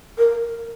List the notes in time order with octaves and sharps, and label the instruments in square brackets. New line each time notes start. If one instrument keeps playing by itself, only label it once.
[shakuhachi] A#4